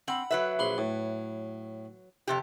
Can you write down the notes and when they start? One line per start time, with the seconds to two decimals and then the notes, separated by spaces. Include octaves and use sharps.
0.08 C4 F#5 B5
0.31 F#3 B4 E5
0.59 A#1 B5 C6
0.78 A2
2.27 F2 C3 G4